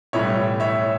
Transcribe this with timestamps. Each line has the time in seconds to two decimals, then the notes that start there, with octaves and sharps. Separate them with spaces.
0.13 B1 A2 E3 G3 C#5 E5
0.60 C#5 E5